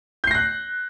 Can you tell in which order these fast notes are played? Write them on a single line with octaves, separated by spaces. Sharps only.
G6 C7 A#6 F#6